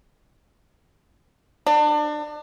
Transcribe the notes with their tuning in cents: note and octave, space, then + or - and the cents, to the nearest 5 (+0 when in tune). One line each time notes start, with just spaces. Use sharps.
D4 +30